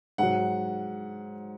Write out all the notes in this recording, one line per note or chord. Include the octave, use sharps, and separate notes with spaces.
G#2 F#3 F#5